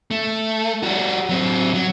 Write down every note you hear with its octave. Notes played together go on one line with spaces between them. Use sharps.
A3
G3 F#4
F#3 C4
F#3